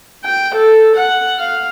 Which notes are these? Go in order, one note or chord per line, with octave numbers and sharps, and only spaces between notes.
G5
A4
F#5
F5